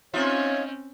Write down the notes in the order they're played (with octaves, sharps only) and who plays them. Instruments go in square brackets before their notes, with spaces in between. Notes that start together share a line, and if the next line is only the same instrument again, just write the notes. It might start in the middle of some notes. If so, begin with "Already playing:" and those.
[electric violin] C4 C#4 [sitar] D#4 F4 E5 [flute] C#5